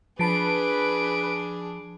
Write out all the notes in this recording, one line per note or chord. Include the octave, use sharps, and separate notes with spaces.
F3 D4 G#4 B4 A5 B5 D7